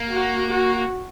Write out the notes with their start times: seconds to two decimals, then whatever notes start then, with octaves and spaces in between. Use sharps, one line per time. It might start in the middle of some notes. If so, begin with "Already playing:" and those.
Already playing: A#3
0.10 F#4
0.47 F#4